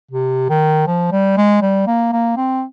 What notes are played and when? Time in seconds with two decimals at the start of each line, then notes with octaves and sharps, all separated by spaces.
0.11 C3
0.49 D#3
0.87 F3
1.11 G3
1.37 G#3
1.62 G3
1.87 A#3
2.12 A#3
2.37 C4